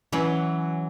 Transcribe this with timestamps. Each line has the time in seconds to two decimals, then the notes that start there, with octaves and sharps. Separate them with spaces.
0.12 E3 F#3 C#4